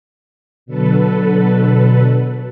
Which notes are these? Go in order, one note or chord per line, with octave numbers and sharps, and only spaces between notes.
B2 D3 F#3 A4 B4